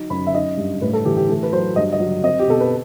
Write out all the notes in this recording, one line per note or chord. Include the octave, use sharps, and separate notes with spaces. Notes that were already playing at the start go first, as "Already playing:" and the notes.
Already playing: F#3 D#4
F#2 B5
E5
D#4 D#5
G2
A2 B4
A4
E3 G4
G4
A3
B4
F#3 C5
G2 D#5
D#5
F#3
C4 D#5
G4
B2 A4
B4